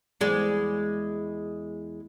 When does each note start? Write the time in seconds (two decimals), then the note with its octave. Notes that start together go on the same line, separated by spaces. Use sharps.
0.21 E2 G#3 D5